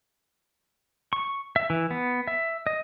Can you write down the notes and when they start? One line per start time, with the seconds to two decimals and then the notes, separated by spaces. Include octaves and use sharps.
1.13 C#6
1.56 E5
1.70 E3
1.91 B3
2.28 E5
2.67 D#5